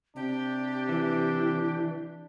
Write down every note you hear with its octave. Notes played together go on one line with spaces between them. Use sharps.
C3 D4 G4
E3